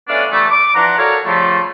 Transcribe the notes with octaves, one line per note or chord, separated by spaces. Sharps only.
A3 B3 C#4 D4 D5 F5
D3 E3 G3 A3
D6
E3 F3 D4 F#5 A#5
F#4 A4 A#4 C#5 D5 F5
C#3 F3 G3 A3